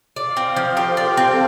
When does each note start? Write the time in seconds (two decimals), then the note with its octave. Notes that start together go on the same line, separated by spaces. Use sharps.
0.16 D5 F5
0.37 C4
0.46 C5
0.56 F3
0.77 G4 A4
0.97 D5
1.17 C4